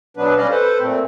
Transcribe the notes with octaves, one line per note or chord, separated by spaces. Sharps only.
B2 F#3 B3 D4 B4
G3 C#4 D5 D#5 F5
A4 B4 C5
A#2 A3 C4